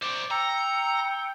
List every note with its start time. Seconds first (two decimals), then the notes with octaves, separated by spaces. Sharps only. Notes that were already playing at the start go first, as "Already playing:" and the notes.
0.02 C5 D5 D6
0.31 G5 A#5 E6 C#7